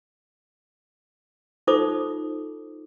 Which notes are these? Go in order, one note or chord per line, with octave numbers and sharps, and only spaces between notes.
D#4 F4 A4 C5 D6 D#6